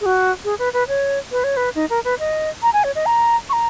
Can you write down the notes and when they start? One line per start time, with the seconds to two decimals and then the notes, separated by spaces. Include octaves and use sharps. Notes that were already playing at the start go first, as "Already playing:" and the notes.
0.01 G#4
0.06 F#4
0.44 G#4
0.59 B4
0.73 B4
0.88 C#5
1.31 B4
1.44 C#5
1.57 B4
1.75 D#4
1.90 A#4
2.04 B4
2.19 D#5
2.62 A#5
2.73 G#5
2.84 C#5
2.95 D#5
3.06 A#5
3.49 C#6
3.53 A#5